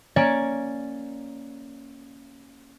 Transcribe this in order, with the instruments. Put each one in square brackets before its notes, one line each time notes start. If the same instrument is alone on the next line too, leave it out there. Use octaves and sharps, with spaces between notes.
[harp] A#3 C#4 C#5 D5